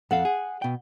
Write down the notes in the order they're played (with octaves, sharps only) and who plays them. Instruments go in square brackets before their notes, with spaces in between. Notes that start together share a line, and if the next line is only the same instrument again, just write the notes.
[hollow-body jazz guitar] F2 A4 F5 [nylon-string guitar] F#5
[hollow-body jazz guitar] G#4
B2 G5